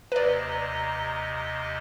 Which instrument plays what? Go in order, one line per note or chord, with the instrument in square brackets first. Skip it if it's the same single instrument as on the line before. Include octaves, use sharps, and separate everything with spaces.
[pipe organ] D#2 C3 D#5 [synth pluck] B4 D5 [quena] A#5